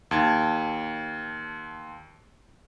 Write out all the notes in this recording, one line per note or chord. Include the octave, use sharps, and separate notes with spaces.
D#2 A5 G#6